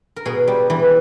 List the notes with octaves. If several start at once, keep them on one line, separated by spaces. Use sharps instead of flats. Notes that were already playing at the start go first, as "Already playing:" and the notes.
A#4
B2 G#4
G3
E3